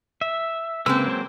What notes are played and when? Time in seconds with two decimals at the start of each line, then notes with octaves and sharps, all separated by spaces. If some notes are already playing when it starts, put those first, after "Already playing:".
0.21 E5
0.86 C#3 G#3 A#3 C4 B4 E6
1.07 F#3 C5